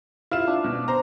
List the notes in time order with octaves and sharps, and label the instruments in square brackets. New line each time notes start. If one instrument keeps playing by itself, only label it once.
[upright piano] E4 F4 E7 [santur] F5
[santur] D4
[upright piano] B2
C5 A#5